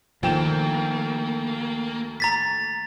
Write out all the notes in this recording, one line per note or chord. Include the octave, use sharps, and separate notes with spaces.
D2 D#3 F3 A#3 G5 E7
A#5 A6 B6